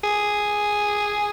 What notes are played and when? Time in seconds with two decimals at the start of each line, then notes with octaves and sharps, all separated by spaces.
0.04 G#4